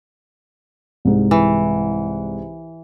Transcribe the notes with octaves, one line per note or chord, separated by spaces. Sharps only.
C2 G#2
E3